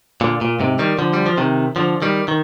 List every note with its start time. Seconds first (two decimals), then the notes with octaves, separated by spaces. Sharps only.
0.21 A#2 D3
0.41 A#2
0.60 G#2 C3
0.79 D#3 G3
0.99 D3 F3
1.13 G3
1.26 F3
1.38 C3 D#3
1.76 D3 F3
2.02 D#3 G3
2.28 D#3